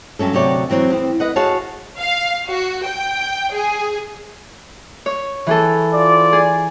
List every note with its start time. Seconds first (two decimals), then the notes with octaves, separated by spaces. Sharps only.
0.19 G2 F#3 C#4 A4
0.33 D2 C3 F#3 C#5 D5
0.70 E3 F#3 C4 C#5
0.90 E2 C4
1.20 B4 D#5 F#5
1.36 F#4 G#4 C#5 F5 A5
1.98 F5
2.48 F#4
2.86 G5
3.53 G#4
5.06 C#5
5.47 E3 G#4 A4
5.93 F4 C5 D5
6.33 G#4